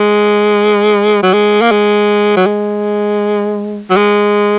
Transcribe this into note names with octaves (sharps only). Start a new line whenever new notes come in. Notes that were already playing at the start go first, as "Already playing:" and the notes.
Already playing: G#3
F#3
G#3
A#3
G#3
F#3
G#3
F#3
G#3